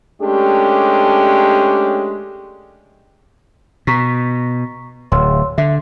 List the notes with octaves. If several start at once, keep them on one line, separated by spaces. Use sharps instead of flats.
G#3 A3 C#4 D4 G4
B2 A#5 C#6 B6
D1 C#5 C6 E6
D3 E5